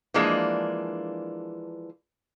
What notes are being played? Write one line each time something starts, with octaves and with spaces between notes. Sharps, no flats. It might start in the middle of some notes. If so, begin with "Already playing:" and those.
E3 F3 G#3 A#3 D4